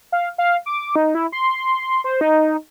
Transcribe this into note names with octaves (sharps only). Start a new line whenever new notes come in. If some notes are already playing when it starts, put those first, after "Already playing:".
F5
F5
D6
D#4
E4
C6
C5
D#4